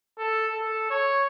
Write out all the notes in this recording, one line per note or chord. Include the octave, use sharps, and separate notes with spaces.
A4
A4
C#5